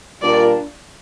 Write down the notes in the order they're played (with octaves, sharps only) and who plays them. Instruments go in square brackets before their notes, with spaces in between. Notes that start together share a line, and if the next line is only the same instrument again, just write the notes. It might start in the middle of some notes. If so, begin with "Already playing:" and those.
[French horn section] A#2 G3 D4 F4 A#4 [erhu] D5